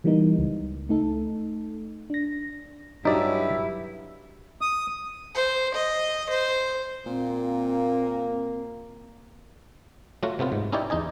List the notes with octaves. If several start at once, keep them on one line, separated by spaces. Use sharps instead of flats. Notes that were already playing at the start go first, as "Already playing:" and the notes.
E3 G3 A#3 B3 D#4
C#2
A3 D#4 A4
D4 A#6
G2 F#3 D#4 E4 D5
D#6
C5
D#5
C5
A#2 A#3 C4
F#3 A3 F4 F#4
C3 A3 B3 F4
G#2
C#4 D#4 E4 G4 C#5 D5
E2 D#4 D#5 G#5